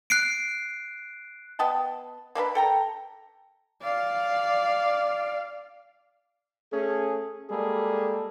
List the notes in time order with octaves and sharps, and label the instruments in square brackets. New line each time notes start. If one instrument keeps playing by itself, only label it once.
[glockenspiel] F#6 C7 D7
[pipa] B3 D#5 G5 A5
A#3 D4 A4 B4
A4 G5 A#5
[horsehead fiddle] D5 F5
[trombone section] A3 C#4 G#4
G3 G#3 A#3 G#4 A4